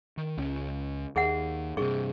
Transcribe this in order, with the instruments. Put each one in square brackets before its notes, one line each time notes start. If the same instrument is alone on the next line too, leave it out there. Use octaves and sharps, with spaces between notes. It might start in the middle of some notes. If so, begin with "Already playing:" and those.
[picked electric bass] D#3
C#2 C#4
[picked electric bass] D#2 [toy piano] G#4 E5 F#5
[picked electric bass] G2 C3 [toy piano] G#4 C#6